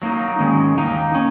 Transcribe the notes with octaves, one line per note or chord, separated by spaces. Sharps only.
F#3 A#3 D#4
D#3 G#3 C#4
D#3 A#3 D#4
C#4